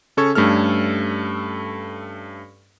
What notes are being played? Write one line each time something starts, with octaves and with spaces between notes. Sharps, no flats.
C#3 C#4 A4 C#6 G#6
G2 A3 C#4 A4 F6